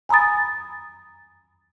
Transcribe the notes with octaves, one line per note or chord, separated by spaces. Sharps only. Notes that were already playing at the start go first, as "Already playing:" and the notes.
G#5 A#5 B5 D#6 A6